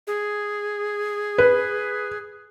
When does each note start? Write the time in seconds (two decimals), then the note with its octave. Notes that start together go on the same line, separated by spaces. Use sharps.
0.07 G#4
1.38 B4